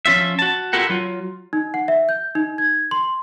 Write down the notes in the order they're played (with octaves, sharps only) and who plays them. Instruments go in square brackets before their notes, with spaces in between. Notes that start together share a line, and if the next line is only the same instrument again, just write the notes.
[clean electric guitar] F3 C#4 F4 E5
F#4 A5
E4 F4 G4 A4 A#4 F#5
F#3 F4
[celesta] D#4
F#5
E5
G6
D#4
G#6
C6